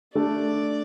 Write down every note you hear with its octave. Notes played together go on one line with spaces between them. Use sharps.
A3 D4 A4 D5